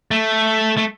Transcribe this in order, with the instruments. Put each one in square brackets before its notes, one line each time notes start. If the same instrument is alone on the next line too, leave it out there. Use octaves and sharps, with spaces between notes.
[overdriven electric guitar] A3
A3